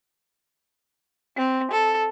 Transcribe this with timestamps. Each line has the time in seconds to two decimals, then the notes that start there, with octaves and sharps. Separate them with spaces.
1.37 C4
1.71 A4